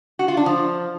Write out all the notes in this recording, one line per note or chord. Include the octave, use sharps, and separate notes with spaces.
F#4
F4
D4
F3